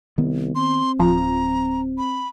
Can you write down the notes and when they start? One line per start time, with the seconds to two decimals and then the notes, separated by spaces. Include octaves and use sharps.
0.18 C2 D#3 B3
0.55 C4 C6
1.00 D1 F3 A#5
1.98 B5